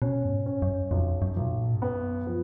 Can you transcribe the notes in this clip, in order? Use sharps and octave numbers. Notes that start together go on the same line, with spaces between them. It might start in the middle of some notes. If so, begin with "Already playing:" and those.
B2 C#4
F#2
G#2
C#4
F#2
B1 F2
F#2
B1 B2
A#2
G#2
F#2 B3
F3